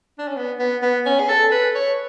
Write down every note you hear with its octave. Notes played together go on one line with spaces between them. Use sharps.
D4
C#4
B3
B3
B3
C#4
G#4
A4
B4
C#5